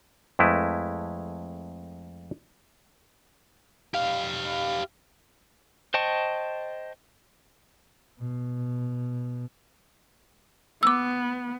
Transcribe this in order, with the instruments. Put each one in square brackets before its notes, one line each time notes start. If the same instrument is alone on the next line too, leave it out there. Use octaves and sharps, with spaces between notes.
[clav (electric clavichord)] F2 G#3 A3 E4 B4
[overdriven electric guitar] G4 F5
[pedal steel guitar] C5 D#5 G5 A5 C#6
[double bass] B2
[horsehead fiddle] B3 [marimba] D6 E6